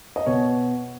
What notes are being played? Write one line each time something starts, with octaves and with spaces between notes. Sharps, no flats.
D#5
B2 C#5